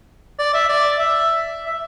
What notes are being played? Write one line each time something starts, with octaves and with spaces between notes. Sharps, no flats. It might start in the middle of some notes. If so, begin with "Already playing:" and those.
D5
E5
D5
E5
E5